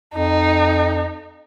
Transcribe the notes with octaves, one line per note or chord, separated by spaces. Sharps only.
F2 D#4